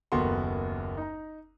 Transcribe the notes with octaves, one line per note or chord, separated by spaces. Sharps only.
F#1 D#2 B3 F#4 A4 C6
D#4 A#5